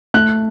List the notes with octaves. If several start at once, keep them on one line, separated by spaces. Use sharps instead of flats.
A3 F#6